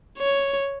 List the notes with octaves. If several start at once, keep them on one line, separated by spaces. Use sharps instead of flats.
C#5